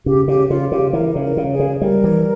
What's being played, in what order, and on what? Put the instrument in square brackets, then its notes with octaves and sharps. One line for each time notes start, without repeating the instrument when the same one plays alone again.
[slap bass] C#3 [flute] G4
[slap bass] C#3 [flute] G4
[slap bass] C#3 [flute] F4
[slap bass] C#3 [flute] G4
[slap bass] E3 [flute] A#4
[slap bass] C#3
[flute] A#4
[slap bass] C#3
[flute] G#4
[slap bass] C#3
[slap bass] G3 [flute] A#4
[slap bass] E3